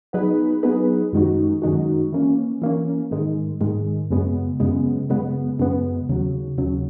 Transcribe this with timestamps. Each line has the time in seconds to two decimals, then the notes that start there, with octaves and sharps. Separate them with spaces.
0.13 F#3 B3 D#4 G#4 B4
0.63 F#3 B3 D#4 G#4 B4
1.13 F#2 D#3 G#3 D#4 F#4
1.62 F#2 D#3 G#3 D#4 F#4
2.12 E3 A#3 C#4
2.62 E3 A#3 C#4
3.11 G#2 D#3 G#3
3.61 G#2 D#3 G#3
4.10 F#2 C#3 G#3 B3
4.60 F#2 C#3 G#3 B3
5.09 F#2 C#3 G#3 B3
5.59 F#2 C#3 G#3 B3
6.09 D#2 C#3 F#3
6.58 D#2 C#3 F#3